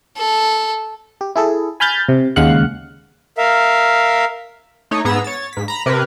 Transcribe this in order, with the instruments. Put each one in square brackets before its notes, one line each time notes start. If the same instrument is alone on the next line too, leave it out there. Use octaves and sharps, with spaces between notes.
[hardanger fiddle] A4
[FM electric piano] G4
E4 G#4 A4
G#5 B5 F6 G6 A6
C3
D#2 C#3 G#3 F5 F#5 F#6
[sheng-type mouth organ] A#4 E5 F5
[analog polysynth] A3 D#4 C#5
G#2 B3 G#4 A#5 E6
C#5 A6
G#2 B6
A#5 B5
C3 A#4 B4